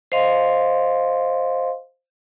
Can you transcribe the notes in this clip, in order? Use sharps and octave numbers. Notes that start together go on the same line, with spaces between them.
C5 D#5 F5 C6